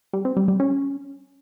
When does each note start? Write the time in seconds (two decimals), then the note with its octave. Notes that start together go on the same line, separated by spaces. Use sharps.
0.13 G3
0.25 C4
0.37 G3
0.48 G3
0.60 C#4